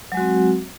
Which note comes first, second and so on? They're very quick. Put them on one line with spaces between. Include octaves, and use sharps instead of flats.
F#3 G#3 F#4 C4